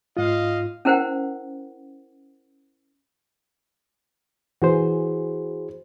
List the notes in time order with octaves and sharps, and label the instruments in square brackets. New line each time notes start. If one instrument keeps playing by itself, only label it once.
[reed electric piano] G#2 F4 [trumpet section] D#5 F5
[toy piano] C#4 E4 A#4 C5 F#5 G5
[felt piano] E3 [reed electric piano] F#4 G#4 C5